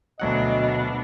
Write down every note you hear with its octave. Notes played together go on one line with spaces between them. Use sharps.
D2 B2 F#3 D4 D#5 F#5